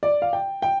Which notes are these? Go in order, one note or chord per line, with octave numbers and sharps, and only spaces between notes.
D5
F5
G5
G5